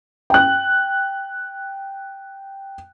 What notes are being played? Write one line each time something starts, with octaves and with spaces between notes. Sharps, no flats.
G5 F#6